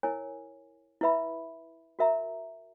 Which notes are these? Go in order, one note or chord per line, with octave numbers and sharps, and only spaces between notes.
E4 A#4 C#5 G#5
E4 B4 E5 B5
F#4 A#4 E5 A#5